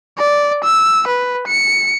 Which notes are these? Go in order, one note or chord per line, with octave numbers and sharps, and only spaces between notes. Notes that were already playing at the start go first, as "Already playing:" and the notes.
D5
E6
B4
C#7